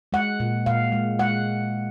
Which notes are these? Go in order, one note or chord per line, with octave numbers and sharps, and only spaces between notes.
G#3 F#5
A#2
A#2 F5
G#3
G#3 F#5